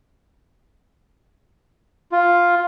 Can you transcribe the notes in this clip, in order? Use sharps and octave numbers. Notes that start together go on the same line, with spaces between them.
F4